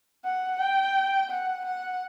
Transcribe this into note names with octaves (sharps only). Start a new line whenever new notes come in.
F#5
G5
F#5
F#5